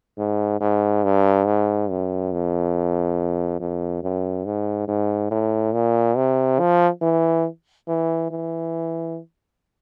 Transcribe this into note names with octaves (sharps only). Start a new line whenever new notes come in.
G#2
G#2
G2
G#2
F#2
F2
F2
F#2
G#2
G#2
A2
A#2
C3
F3
E3
E3
E3